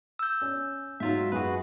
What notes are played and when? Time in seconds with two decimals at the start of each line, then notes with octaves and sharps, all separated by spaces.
0.19 E6 G6
0.42 C#4
1.00 G#2 F#3 F4 E5
1.32 F#2 F#4 G#4 B4